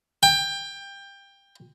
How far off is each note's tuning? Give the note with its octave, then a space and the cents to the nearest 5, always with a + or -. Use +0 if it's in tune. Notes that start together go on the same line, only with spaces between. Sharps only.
G5 +20